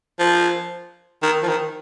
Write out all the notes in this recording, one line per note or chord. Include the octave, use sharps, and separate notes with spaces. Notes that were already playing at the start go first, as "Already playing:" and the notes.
F3
D#3
F3
D#3